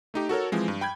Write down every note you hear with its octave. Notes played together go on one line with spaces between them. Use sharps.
A3 D#4 G4
F#4 A4 A#4 C#5
E3 F3 G#3 C4
G2
G5 B5 G6 G#6